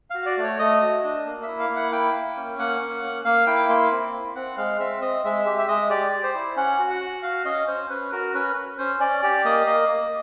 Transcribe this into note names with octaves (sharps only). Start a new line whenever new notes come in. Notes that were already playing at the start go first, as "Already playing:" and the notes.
F#4 F5
D5
A3
C#5
A3 D#5
F#4
D4
A#3
E4 E5
F5
A#3
F#5
E4 G5
A#3
C#4
A#3 F#5
C#4
A#3
A#3 F5
E4 G5
A#3 C6
C4
E4
C4 F#5
G#3 F5
C4 E5
C4 D#5
G#3 E5
G4 E5
E5
G#3 D#5
G4 D5
G4
C5
E4
C#4 F#5
F#4
F#5
F#4
F#4 F5
C#4 D#5
C#4 C5
C#4 B4
F#4 A#4
C#4 B4
C#4
C#4 C5
C#4 D5
G4 D5
A#3 D#5
A#3 D#5
A#3